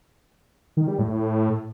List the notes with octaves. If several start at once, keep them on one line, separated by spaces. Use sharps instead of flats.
D#3
G3
A2
A2